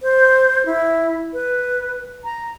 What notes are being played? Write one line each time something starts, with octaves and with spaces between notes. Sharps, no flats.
C5
E4
B4
A#5